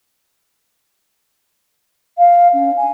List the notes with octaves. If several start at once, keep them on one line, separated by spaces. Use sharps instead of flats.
F5
C#4
G#5